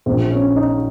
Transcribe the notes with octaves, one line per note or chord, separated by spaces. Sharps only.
A#1 A#2 C4
C#4
D#4